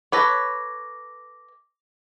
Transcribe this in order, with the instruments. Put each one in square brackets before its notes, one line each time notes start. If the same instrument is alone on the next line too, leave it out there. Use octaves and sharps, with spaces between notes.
[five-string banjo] A4 B4 C#5 [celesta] D6 A#6